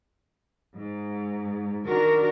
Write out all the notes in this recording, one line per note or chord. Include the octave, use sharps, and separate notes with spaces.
G#2
D#3 D4 F#4 A#4